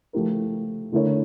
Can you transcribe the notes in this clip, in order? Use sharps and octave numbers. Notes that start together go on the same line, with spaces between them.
F3 A3 E4 G4 A#4
D3 A3 E4 A#4 C#5